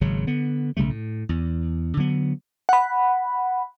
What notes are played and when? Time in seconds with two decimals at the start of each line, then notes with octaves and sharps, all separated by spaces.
0.01 G#1 C#3 F#3
0.27 D3 B3
0.77 B1 C#3 G3 A3
0.90 A2
1.29 E2
1.97 D3 F#3 B3
2.69 F#5 B5